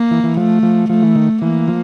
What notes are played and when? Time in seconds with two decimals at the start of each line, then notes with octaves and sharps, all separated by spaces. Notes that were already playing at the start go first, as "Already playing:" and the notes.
Already playing: A#3
0.11 E3
0.24 E3
0.37 F3 A3
0.63 F3
0.89 F3 A3
1.02 E3
1.15 D#3
1.42 E3 A#3
1.68 F3